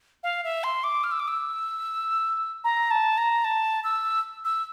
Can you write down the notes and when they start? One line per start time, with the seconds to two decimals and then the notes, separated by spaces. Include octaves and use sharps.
0.23 F5
0.44 E5
0.64 C6
0.84 D6
1.04 F6
1.12 E6
1.20 D6
1.28 E6
2.64 A#5
2.91 A5
3.18 A#5
3.44 A5
3.84 E6
4.44 E6